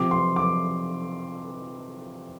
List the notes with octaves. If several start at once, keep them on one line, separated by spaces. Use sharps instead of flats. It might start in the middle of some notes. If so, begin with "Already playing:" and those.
Already playing: C3 F3 C4 D6
C6
D6